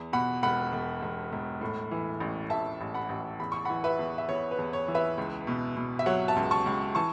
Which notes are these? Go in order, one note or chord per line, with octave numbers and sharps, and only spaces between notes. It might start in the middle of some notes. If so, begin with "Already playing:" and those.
Already playing: E2
B2 F#5 B5
E1 F#5 B5
E1
E1
E1
A2
E3
A1
A1 E5 A5
A1
F#5 B5
A1
E2 B5
C#6
E3 F#5 B5
B4 E5
E2
E5
E2 C#5
B4
E2
C#5
E3
B4 E5
C#2
B2
B2
E5
F#3 C#5 F#5
E5 A5
C#2
A5 C#6
C#2
E3 A5 C#6